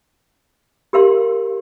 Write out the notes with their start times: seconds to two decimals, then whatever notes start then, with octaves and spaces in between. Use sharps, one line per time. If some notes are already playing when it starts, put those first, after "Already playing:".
0.93 G4 A#4 F5 C6